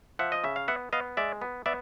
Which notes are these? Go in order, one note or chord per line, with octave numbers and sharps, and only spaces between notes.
F3 E5 F#5
D#5
C#3 E5
F5
B3 E5 F#5
B3 D#5 F5
G#3 D5 E5
B3
B3 D5 E5